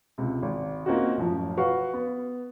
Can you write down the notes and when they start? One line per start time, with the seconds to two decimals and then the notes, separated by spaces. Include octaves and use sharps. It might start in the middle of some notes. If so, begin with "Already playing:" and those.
0.18 C#2 C3
0.42 G#1
0.86 A#3 C4 C#4 D#4 F4 F#4
1.17 A1 F#2 F3
1.57 F#4 B4 F5 F#5 C#6
1.93 B3